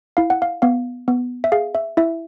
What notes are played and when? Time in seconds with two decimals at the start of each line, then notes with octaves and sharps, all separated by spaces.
0.17 E4 F5
0.30 F#5
0.42 F5
0.62 B3 F5
1.08 B3
1.44 E5
1.52 G#4 F5
1.75 E5
1.97 E4 E5